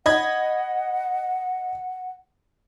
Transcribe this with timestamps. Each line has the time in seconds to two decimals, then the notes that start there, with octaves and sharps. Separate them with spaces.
0.06 D#5 F#5 B5 G#6